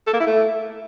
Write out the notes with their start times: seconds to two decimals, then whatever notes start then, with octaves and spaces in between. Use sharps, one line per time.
0.07 A4
0.14 A#3
0.20 E4
0.27 A3